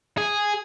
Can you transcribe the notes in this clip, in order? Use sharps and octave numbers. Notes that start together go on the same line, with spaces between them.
G#4